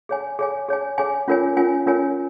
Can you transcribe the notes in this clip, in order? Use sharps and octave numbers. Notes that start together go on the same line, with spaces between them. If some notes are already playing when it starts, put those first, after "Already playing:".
G#4 C#5 G#5
G#4 C#5 G#5
G#4 C#5 G#5
G#4 C#5 G#5
C#4 F4 A#4 C#5 G#5
C#4 F4 A#4 C#5 G#5
C#4 F4 A#4 C#5 G#5